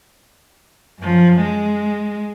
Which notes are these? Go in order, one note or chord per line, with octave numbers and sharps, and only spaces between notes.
F#2 F3
G#3